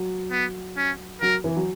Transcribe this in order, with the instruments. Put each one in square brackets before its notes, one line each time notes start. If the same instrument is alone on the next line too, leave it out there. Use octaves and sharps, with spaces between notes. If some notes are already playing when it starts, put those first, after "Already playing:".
Already playing: [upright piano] F#3
[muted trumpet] B3
C#4
[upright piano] F#3 [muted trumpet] A#4
[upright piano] E3
F#3